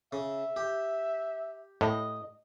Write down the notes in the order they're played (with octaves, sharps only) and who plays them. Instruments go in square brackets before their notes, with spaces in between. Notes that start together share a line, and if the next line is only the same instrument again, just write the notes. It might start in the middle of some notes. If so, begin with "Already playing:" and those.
[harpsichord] C#3 [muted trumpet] E5
[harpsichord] G4
[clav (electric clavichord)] A2 [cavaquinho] D#5